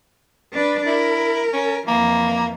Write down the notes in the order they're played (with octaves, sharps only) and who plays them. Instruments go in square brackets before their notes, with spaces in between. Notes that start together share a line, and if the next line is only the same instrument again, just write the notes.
[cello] D4 B4
[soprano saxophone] E4 [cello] A#4
[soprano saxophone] C#4
[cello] F2 E3 [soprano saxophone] A#3